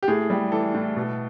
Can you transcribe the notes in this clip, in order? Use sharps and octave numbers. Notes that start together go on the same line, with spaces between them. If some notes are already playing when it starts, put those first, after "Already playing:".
G4
A2 G#4
G3
E3 A4
A2
B2